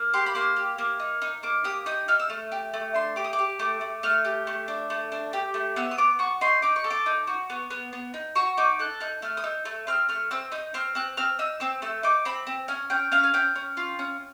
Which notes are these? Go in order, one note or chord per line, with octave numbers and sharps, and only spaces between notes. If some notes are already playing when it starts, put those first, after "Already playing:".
Already playing: A#3
G4 C6
B5
A#3 C6
G4
A#3
D#4
D#4
A#3 D6
G4 D#6
D#4 D#6
D#4 F6
E6
A3 F6
G4
A3
D4 C6
G4 D6
D#6
D6
G4
A3 D6
A3
A3 F6
G4
A3
D4
A3
D4
G4
A3
B3 E6
D#6
B3 D6
F#4 C#6
D#4 C6
D#4 D6
C#6
A4
D6
D#4
F#4
B3
B3
B3
D#4
F#4 C#6
D#4 D6
A4 F#6
D#4 F#6
A3 F6
D#6
D#4 E6
A3
C4 F6
A3 F6
C4 E6
D#4 D#6
C4 F6
C4 F#6
C4 F6
D#4 E6
C4 E6
A3 E6
D#4 D6
C4 B5
C4
C#4 G#5
C#4 G5
C#4 F5
G#5
C#4 G5
C#4
F4
C#4